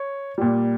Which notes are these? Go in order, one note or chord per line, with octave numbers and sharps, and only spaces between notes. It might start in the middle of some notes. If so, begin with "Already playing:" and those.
Already playing: C#5
A#2 G3